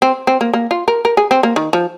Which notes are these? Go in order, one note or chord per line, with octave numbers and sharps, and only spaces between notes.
C4
C4
A#3
A#3
F4
A#4
A#4
G#4
C4
A#3
D#3
F3